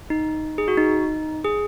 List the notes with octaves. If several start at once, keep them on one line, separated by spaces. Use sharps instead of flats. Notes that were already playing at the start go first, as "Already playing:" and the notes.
D#4
G#4
F#4
D#4
G#4